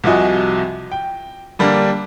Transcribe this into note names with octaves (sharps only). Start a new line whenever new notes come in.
C2 C3 F3 F#4 D#5 G#5
G5
D3 G3 A#3 D4